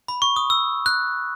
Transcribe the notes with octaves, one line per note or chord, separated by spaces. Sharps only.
B5
C#6
D#6
E6
F#6